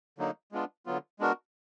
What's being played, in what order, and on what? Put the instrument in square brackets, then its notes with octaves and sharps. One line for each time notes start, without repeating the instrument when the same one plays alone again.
[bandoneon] D3 F#3 A#3 D#4
G#3 B3 D4 F4
D3 F#3 B3 F4
G#3 B3 D4 F#4 A#4